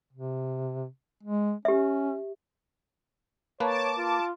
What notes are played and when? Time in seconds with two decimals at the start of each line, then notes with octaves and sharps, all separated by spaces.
0.13 C3
1.23 G#3
1.65 C#4 G4 E5
3.60 A#3 B4 C#5 A5 D6
3.98 F4